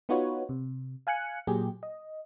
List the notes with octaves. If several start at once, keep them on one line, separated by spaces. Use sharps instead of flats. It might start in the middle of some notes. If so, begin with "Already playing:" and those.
B3 D#4 F4 F#4 B4 C#5
C3
F5 G#5 F#6 C#7
A#2 F#3 G4 G#4
D#5